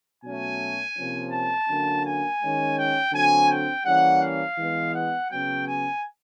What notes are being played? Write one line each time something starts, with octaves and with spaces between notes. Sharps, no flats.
B2 F#3 A3 C#4 G#5
C3 F3 A#3 C#4
A5
D3 F#3 A#3 C#4
G#5
D#3 G#3 C#4
G5
D3 F#3 A3 C4 G#5
G5
E3 G3 A#3 C#4 F#5
F5
E3 G#3 B3
F#5
C#3 F#3 B3 G5
G#5